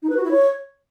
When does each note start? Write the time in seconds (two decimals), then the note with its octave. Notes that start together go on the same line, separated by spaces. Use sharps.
0.03 D#4
0.10 B4
0.17 F#4
0.24 E4
0.31 C#5